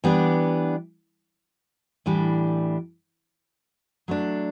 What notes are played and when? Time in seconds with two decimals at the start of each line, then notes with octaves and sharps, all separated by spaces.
0.04 E3 G3 B3 D4
2.06 A2 E3 G3 D4
4.08 F#3 A3 D4